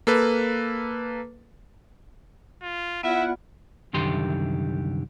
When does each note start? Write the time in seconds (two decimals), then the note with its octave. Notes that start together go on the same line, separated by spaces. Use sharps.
0.07 A#3 A4 B4
2.62 F4
3.03 B3 E4 F4 D5 E5 F#5
3.93 C2 F#2 D3 D#3 G4 C6